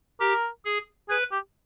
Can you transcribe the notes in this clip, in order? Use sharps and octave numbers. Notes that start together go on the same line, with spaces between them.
G4 A#4
G#4
G#4 B4
G4